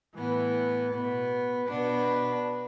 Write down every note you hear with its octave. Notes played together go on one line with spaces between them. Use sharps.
A2 E3 B3
B2 B3
B2 B3 D4